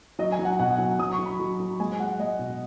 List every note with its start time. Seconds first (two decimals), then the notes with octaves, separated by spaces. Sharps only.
0.19 F#3 D#5
0.32 G#5
0.39 F#3
0.45 F#5
0.59 B2 F#5
0.79 F#3 F#5
0.99 F#3 D#6
1.13 C#6
1.19 F#3
1.26 B5
1.40 F#3
1.60 F#3
1.80 G#3 G#5
1.99 G#3 F#5
2.19 G#3 D#5
2.39 B2